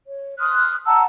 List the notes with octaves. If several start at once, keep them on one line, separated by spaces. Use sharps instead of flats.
C#5
C6 D#6 F6 F#6
F#5 A5 A#5 E6